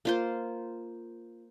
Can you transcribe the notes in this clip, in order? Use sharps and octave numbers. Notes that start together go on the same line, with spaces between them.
A#3 F4 C5